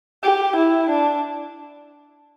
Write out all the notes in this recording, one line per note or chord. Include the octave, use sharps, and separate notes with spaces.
G4
E4
D4